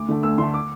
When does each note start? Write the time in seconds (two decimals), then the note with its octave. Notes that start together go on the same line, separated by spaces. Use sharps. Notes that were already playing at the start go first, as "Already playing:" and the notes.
Already playing: D2 D6
0.09 D3 A3
0.23 D2 E6
0.38 D3 A3 C6
0.54 D6